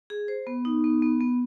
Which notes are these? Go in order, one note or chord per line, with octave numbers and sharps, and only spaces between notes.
G#4
C5
B3
D#4
B3
B3
B3